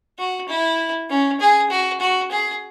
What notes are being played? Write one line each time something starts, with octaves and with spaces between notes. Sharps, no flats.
F#4
E4
C#4
G#4
F#4
F#4
G#4